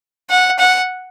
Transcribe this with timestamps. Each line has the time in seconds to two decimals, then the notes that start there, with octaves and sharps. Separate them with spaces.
0.30 F#5
0.59 F#5